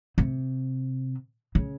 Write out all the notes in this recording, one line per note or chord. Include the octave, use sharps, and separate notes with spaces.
C3
C#3